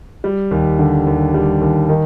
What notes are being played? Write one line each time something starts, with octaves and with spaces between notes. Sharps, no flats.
G3
D#2
D3
D#2
G3
D#2
D#3